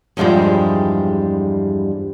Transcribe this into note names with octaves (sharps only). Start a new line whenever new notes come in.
E2 G2 F3 G3 G#3